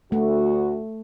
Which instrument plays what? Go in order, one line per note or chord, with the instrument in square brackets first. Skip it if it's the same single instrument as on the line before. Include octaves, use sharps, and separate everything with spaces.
[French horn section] D2 F#4 [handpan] A3